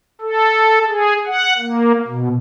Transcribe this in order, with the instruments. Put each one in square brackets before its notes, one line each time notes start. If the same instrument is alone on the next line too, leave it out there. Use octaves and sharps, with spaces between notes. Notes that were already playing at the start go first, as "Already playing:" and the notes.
[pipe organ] A4
G#4
F#5
A#3
B2